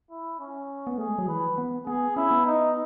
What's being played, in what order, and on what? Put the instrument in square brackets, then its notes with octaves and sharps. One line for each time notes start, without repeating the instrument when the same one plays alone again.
[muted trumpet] E4
C#4
[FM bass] B3
[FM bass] A3 [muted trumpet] G#4
[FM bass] G#3
F#3
[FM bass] E3 [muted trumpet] B4
[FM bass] B3
[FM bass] B3 [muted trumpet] G#4
[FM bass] C#4 [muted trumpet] E4
[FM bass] B3
[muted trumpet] D#4